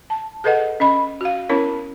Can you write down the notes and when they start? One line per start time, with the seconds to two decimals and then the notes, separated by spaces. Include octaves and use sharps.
0.10 A5
0.44 G#4 A4 B4 D#5 F#5
0.80 C#4 D#5 B5
1.21 F#4 F5
1.49 B3 C#4 E4 A#4 C#5